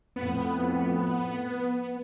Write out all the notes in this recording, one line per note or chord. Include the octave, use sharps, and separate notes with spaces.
F2 A2 B3